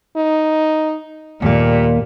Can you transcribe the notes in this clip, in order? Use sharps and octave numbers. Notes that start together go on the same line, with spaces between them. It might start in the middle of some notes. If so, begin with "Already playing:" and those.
D#4
D#2 A#2 G3 A#3